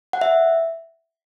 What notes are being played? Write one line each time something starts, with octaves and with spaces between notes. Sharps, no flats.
F#5
E5